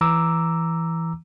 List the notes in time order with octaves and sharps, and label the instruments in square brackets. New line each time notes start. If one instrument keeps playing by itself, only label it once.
[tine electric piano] E3 A#5 D6 E6